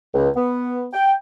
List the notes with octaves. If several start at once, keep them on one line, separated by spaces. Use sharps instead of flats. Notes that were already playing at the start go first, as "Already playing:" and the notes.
C#2
B3
G5